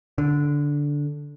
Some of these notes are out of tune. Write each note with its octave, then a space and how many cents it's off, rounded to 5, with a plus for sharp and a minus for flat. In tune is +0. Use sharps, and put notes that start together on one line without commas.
D3 -10